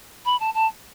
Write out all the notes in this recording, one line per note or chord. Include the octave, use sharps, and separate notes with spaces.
B5
A5
A5